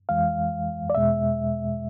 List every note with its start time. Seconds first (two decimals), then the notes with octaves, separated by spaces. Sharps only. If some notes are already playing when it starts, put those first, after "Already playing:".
0.09 F2 E3 G#3 F5
0.90 D5
0.95 E2 B2 G#3 E5